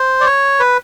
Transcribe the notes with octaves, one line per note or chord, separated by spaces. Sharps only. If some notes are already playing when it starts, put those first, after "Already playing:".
Already playing: C5
D5
C#5
B4